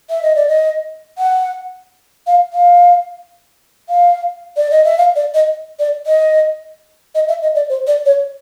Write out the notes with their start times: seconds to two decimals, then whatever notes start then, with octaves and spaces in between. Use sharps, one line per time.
0.10 E5
0.23 D#5
0.35 D5
0.48 D#5
1.18 F#5
2.27 F5
2.53 F5
3.89 F5
4.57 D5
4.71 D#5
4.84 E5
4.98 F5
5.16 D5
5.34 D#5
5.79 D5
6.07 D#5
7.15 D#5
7.28 E5
7.42 D#5
7.55 D5
7.69 C5
7.87 D5
8.05 C#5